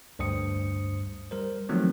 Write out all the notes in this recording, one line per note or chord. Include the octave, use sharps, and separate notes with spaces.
D2 G2 C5 D#6 C#7
G3 A#4 C5
D#3 F3 F#3 A3 C4